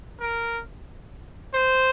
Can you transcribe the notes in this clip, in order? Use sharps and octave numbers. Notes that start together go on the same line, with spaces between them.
A#4
C5